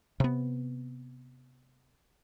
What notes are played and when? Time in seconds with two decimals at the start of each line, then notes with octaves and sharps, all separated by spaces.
0.20 C3 B3